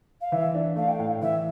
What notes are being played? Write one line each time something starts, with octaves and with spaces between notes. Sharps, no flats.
F5
E3 E5
D4
A3 F5
G5
A2 F5
E3 E5